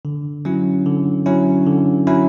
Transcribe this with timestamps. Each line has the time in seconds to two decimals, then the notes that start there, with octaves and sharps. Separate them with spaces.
0.05 D3
0.45 F#3 C#4 E4
0.86 D3
1.26 F#3 C#4 E4
1.66 D3
2.07 F#3 C#4 E4